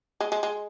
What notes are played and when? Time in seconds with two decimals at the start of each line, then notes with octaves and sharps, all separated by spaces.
0.21 G#3
0.32 G#3
0.43 G#3